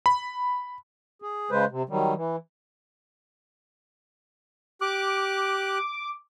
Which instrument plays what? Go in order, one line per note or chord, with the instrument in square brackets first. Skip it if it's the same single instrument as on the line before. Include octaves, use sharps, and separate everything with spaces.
[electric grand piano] B5
[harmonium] G#4
C#3 G#3 B4 C5
C3
D#3 F#3 G3
E3
[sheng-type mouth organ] G4 F#6 [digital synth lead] D6